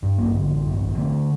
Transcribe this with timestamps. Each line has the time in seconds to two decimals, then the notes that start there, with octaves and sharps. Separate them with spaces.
0.02 G2
0.18 A1 A#3
0.34 D3
0.50 A1
0.65 G2
0.82 A1
0.97 D3 A3